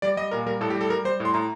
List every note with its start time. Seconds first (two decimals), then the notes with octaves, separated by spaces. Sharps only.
0.02 G3 D5
0.17 G3 D#5
0.31 A#2 A#4
0.46 G3 A#4
0.61 A2 A4
0.70 G4
0.75 G3
0.81 A4
0.90 G3 A#4
1.05 G3 C5
1.20 A2
1.25 C6
1.34 A2 A#5